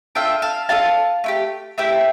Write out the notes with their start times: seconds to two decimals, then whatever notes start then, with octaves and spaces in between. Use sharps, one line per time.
0.15 D4 F4 A4 E5 G5
0.42 F5 A5
0.69 D4 F4 A4 F5 A5
1.24 A3 E4 G4
1.78 A3 E4 G4 E5 G5